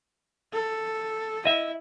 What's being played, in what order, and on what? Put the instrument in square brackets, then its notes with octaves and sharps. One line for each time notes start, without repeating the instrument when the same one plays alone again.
[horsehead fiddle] A4
[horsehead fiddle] E4 [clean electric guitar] D#5 E5